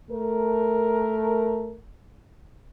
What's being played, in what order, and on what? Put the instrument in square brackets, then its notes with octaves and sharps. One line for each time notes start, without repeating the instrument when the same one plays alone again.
[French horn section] A3 A#4